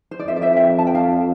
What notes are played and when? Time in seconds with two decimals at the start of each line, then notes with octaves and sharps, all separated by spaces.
0.11 C5
0.19 D5
0.27 F2 C5 E5
0.36 D5
0.42 C5 E5
0.56 E5 G5
0.79 A5
0.87 G5
0.95 F5 A5